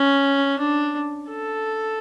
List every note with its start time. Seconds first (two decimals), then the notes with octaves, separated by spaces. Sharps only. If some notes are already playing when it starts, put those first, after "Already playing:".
Already playing: C#4
0.60 D4
1.30 A4